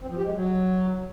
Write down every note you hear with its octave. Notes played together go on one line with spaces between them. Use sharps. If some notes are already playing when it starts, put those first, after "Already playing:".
C4
F3
G4
G#3
F#3